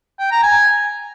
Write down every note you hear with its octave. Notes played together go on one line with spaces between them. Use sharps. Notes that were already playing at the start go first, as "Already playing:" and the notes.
G5
A#5
G#5